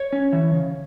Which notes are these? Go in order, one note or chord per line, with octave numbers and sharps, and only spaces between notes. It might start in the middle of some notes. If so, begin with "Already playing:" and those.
Already playing: C#5
C#4
E3
C#3